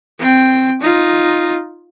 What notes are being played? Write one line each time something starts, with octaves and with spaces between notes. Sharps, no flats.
C4 G5
D#4 F4